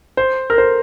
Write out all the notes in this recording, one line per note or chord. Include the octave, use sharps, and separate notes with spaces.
C5
A#4
C5